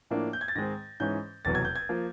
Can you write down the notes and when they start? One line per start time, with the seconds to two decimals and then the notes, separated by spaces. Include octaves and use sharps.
0.11 A2 F3 A#3 D4
0.33 G6
0.41 G#6
0.48 A6
0.56 G#2 D#3 G#3 C4 A#6
1.00 G#2 E3 G#3 C#4 G6
1.45 F1 E2 B2 F#3 A6
1.55 G#6
1.65 G6
1.76 G#6
1.89 F3 A#3